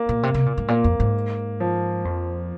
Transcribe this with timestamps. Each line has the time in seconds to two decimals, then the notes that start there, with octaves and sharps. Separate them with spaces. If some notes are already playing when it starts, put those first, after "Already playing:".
Already playing: A#3
0.09 A#2
0.23 C3
0.34 C3
0.46 A#2
0.58 G#2
0.68 A#2 A#3
0.84 F2
1.00 G#2
1.60 F3
2.05 F2